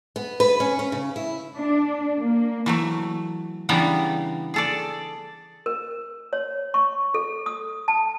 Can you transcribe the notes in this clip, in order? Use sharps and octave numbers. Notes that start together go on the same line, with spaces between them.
B3
B4
C#4
C#4
C#3
E4
D4
A#3
E3 F#3 A3
C#3 E3 G3 B3 D4 A#5
G#4 A4 D5
A#4
C#5
C#6
A4
D#6
A5